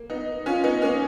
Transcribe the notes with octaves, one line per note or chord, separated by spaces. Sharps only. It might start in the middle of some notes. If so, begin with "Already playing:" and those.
Already playing: A#3
B3 D#4
C#4 F4
B3 D#4
A#3 C#4